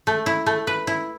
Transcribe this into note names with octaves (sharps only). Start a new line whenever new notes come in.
A3
E4
A3
B4
E4